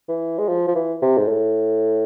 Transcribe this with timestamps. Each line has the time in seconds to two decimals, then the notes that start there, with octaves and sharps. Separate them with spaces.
0.08 E3
0.38 G#3
0.48 F3
0.68 F3
0.75 E3
1.02 C3
1.18 G#2
1.28 A2